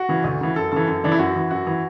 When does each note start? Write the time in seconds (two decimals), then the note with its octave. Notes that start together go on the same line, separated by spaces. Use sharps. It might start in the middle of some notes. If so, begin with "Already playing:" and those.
Already playing: F#4
0.09 C#3 E3
0.24 D2
0.41 C#3 E3
0.56 F#2 A4
0.72 C#3 E3 A4
0.88 F#2
1.04 C#3 E3 D4
1.12 E4
1.19 F#2 F#4
1.36 E3
1.51 F#2 F#4
1.67 E3